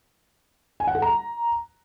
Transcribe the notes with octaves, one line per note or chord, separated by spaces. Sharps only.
G#5
F#5
A4
A#5